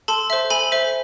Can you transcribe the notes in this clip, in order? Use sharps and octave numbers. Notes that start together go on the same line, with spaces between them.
A4 A5 C6
C5 E5
A4 G#5 B5
C5 E5